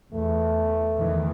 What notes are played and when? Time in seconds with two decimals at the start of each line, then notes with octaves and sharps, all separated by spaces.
0.13 E2 A3
0.98 E2 D#3 E3